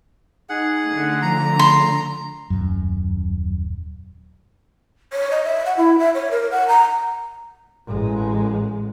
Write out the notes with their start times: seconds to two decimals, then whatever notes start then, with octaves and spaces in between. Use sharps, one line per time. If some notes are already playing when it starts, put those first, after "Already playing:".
0.49 D#4 G#4 F#5
0.87 D3 A3
1.22 F3 A#5
1.59 C6
2.50 D#1 F#2
5.13 C#5
5.31 D#5
5.44 E5
5.65 F#5
5.77 E4
5.99 E5
6.15 C#5
6.31 A#4
6.51 F#5
6.68 A#5
7.87 A1 G#3